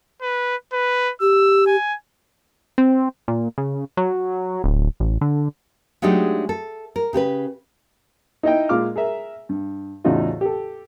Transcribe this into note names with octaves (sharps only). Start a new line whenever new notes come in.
B4
B4
G4 E6
G#5
C4
A#2
C#3
F#3
D1
A1
D3
F#3 G#3 A3 D4 D#4 G4
A4
A#4
C#3 G4 A#4 B4
D#4 E4 D#5 G5
A#2 G#3 F4 F5 D6 F6
G#4 A#4 E5
G2
E2 A2 C#3 D#4 F4 F#4
G4 A4